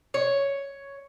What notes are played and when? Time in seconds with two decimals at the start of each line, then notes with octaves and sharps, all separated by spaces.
0.14 C#5